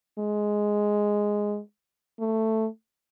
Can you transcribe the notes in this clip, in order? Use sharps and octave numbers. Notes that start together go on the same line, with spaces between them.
G#3
A3